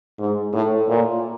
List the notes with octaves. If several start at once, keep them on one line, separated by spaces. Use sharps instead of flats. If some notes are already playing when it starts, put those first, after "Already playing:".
G#2
A2
A#2